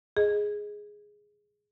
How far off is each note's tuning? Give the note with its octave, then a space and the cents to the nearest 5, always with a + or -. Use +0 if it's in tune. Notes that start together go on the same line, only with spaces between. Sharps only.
G#4 +0 D#5 +0